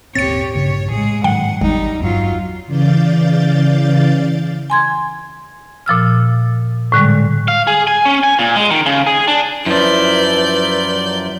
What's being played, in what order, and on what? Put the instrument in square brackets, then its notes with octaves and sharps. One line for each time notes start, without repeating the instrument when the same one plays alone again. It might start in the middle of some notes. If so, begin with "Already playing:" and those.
[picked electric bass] D#1 G#1 C4 [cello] G4 C#5 [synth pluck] A6 C#7
[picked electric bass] A#1 G2 C#3 [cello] C#5
[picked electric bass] A2 [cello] G#3 G#4
[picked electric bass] G#2 D#3 F#3 [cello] F#5 [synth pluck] G5
[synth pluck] G#1 [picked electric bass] E2 [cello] G3 D#4
[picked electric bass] E2 G2 [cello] F#3 F4
[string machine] C#3 E3 D5 F5 G6 A6
[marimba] G#5 C6 G#6
A#2 F3 E6 F6
A2 D3 G3 G#3
[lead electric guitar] F5
G#4
G#5
C#4
G#5
A#2
G#3
D#3
C#3
G#4
D4
[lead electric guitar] F#2 F3 [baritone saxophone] E4 [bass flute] B4 [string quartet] D5 G6